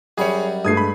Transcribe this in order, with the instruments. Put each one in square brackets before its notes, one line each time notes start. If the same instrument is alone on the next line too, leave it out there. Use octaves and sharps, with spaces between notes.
[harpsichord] F#2 G3 B5 [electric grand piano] G#4 C#5
[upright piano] G2 G#3 A3 [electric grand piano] D#6 G#6 C7
[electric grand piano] B5